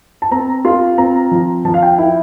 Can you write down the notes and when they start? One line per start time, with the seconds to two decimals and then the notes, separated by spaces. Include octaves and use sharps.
0.22 A5
0.31 C4 A#5
0.65 F4 C6
0.98 C4 A#5
1.31 F3
1.65 F3 A5
1.74 F5
1.83 G5
1.98 E4 G5